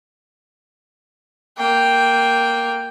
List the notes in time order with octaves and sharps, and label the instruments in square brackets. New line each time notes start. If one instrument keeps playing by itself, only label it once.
[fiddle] A#3 G5